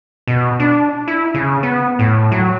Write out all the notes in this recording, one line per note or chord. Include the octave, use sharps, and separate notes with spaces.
B2
D4
E4
C#3
B3
A2
F#3